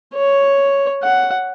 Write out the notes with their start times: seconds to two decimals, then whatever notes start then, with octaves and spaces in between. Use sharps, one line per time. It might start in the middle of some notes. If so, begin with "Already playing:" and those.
0.15 C#5
1.03 F#5